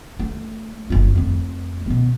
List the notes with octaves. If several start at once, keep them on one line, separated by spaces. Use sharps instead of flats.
A3
F#1 F4
F2 A3
B2 B3